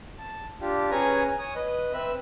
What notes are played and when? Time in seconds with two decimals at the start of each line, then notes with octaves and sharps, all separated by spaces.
0.18 A5
0.61 D4 F4 G4
0.91 C#4 G#4 B4 C#5 G#5 A#5
1.39 C#5 D#6
1.55 B4 D#5
1.93 C4 B4 E5 B5